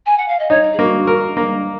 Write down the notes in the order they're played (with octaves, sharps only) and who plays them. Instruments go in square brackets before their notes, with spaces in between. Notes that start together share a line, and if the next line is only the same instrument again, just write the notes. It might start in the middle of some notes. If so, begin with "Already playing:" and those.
[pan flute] G#5
F#5
F5
D#5
[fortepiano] D#4 [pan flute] C#5
[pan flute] G#4
[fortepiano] A#3 [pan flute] F#4
[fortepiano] A#4
A#3